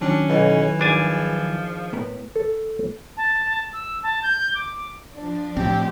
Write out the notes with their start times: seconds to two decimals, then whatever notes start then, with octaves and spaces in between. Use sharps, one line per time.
0.01 D#3 F#3 C#4 D4
0.30 B1 E3
0.80 G#1 F3 D4 G#5
1.93 A2 B3 A#4
2.36 A4
3.17 A5
3.73 E6
4.03 A5
4.22 G6
4.55 D6
5.13 F3 D4
5.57 A2 C4 G4